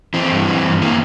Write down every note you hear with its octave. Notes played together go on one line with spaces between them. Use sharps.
E3 C4
G2
E3
G2
E3 A#3